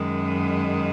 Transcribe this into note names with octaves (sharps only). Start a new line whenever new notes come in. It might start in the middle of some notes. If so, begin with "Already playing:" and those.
Already playing: F#2 D#3 G#3